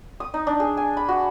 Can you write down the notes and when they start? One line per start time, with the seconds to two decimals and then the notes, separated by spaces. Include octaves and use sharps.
0.20 D#6
0.34 D#4
0.47 D4
0.60 G#4
0.77 G#5
0.97 B5
1.09 F#4